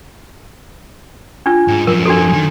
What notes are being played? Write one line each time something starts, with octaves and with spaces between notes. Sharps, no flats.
D4 F4
G#2
F#2 F3 A#4
D4 F#4 A4
D#3